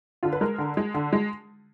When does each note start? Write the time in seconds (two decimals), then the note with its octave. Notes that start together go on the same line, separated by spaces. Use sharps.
0.23 D3 F4
0.33 B4
0.41 G#3 A#4
0.58 D3
0.77 G#3
0.94 D3
1.13 G#3